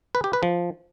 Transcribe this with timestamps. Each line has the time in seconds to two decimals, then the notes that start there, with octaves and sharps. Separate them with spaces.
0.15 B4
0.24 G4
0.33 B4
0.43 F3